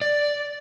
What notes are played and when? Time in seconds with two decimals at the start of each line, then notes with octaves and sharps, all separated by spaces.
0.02 D5